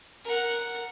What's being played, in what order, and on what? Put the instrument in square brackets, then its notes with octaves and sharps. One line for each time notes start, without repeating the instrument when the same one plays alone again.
[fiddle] A#4 F#5